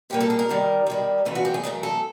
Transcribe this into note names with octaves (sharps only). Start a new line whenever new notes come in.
A#2 G3 A#3 G4
A4
G#4
A#4
G2 D#3 G3
G2 D#3 G3
F#2 C#3 E3 A3 B4
F#4
G4
G#4
F#2 C#3 E3 A3 A#4
A4